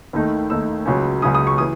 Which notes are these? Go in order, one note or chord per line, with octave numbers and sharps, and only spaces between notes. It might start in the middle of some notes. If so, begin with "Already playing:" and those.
D#2 D#3 A3 D#4
D#2 D#3 A3 D#4 E6
C#2 C#3 F#3 C#4
C#2 C#3 F#3 C#4 D#6
D#6
C#6
E3 D#6